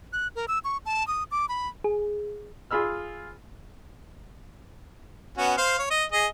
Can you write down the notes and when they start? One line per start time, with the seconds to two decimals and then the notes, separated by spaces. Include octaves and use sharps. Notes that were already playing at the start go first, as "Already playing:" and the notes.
0.13 F#6
0.36 A#4
0.48 E6
0.64 C#6
0.86 A5
1.08 D#6
1.31 D6
1.49 B5
1.84 G#4
2.71 F4 G#4 B5 E6 F6
5.38 B3 C#4 F#4
5.58 C5 F5
5.79 C#5
5.91 D#5
6.12 G#4 D#5